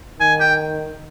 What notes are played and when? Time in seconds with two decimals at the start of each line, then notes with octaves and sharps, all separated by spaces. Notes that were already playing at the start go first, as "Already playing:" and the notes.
0.20 D#3 G#5
0.40 G5